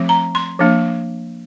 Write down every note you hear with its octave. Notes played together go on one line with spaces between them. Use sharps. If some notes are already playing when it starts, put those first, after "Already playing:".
Already playing: F3 A3 C4
A#5
C6
F3 A#3 D4